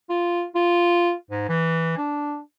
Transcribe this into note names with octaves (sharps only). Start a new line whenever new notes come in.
F4
F4
G#2
E3
D4